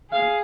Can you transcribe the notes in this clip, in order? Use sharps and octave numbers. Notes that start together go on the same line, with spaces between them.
G#4 F5